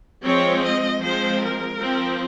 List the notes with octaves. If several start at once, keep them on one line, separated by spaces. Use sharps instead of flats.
F3 G#3 C4 C#5
D#5
F3 G#3 C4 C5
A#4
F3 C4